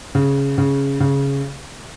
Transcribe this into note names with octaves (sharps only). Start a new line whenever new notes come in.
C#3
C#3
C#3